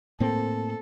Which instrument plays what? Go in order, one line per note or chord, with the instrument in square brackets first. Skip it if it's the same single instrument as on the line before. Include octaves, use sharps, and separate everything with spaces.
[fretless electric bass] A2 A#3 C4 [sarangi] A4